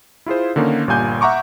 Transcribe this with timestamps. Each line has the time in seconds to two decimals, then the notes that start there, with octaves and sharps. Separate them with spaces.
0.26 E4 F4 G#4 C5
0.56 D3 D#3 A#3 C#4 D#4
0.87 G1 A#2 G3 A#3 G#5 G6
1.21 E5 F#5 A#5 C#6 D6